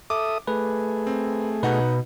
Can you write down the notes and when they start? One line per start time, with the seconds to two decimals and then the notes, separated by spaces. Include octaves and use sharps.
0.10 A4 E5 D6 D#6
0.47 A3 G#4 B4
1.07 C4
1.63 B2 D#4 B4 F#5